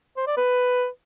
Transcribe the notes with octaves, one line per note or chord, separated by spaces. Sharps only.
C5
D5
B4